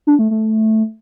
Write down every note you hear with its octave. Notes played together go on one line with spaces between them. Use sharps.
D4
A3
A3